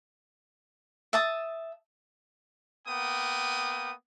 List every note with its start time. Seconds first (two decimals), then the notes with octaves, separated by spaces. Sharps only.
1.13 E5 A5 D#6
2.87 A#3 B3 G5 D#6